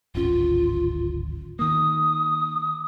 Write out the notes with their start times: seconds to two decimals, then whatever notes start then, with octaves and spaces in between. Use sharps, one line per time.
0.15 D1 G#1 C#4 F4
1.59 D#3 A#3 D#6